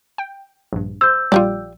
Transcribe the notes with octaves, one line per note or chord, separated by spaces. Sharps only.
G5
A#1 G2
C5 E6 G6
A#1 G3 F4 G4 D5